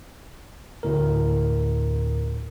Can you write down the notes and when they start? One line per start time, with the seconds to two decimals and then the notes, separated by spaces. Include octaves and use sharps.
0.83 D2 A2 A#4